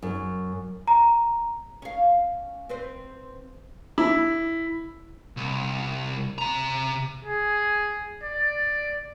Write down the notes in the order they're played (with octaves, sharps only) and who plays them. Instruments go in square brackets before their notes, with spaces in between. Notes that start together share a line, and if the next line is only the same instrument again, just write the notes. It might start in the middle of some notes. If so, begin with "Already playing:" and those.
[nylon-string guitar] F#2
[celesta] A#5
[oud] C#4 F5
C4 B4 C5
[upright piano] E4
[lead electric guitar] C2
C3 A#5
[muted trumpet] G#4
D5